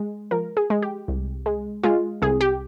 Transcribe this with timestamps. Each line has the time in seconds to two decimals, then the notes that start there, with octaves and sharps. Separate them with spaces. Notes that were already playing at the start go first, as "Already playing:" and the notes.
Already playing: G#3
0.31 F3 A#4
0.57 G#4
0.70 G#3
0.82 G4
1.08 C2
1.46 G#3
1.83 G#3 F4
2.22 C2 G#4
2.41 G4